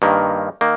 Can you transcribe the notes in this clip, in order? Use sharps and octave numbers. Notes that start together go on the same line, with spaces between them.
G2 D#3 A#3
D#3 A#3